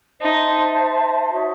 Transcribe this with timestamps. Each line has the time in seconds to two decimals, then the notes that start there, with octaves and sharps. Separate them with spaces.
0.21 D#4 C5 E5 A5 C6
1.31 D#4 F#4 C#5 E5